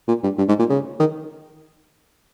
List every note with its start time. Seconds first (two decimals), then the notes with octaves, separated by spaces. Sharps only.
0.08 A#2
0.23 G2
0.38 G2
0.48 G#2
0.59 A#2
0.69 C#3
1.00 D#3